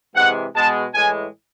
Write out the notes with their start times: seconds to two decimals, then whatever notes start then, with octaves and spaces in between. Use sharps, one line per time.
0.16 C3 E3 G#3 F#5
0.55 B2 G#3 A5
0.94 A2 E3 G#3 G#5